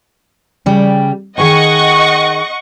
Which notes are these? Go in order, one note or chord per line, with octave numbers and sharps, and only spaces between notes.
C#3 G3 G4
D#3 G#4 D#5 F#5 G5 C#6